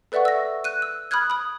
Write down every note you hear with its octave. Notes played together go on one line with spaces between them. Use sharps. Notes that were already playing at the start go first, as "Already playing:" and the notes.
A4 B4 D5 E5 F#5 C#6
E6 A#6
F#6 D#7
E6
B5 D#6 F6 F#6 G#6
B5 D#6